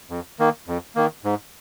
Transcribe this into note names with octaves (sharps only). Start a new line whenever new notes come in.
F2
D#3 A#3
F2
D#3 A#3
G#2